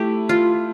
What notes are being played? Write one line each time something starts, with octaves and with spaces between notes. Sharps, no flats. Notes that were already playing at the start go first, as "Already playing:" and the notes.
Already playing: A3 E4 G4
F4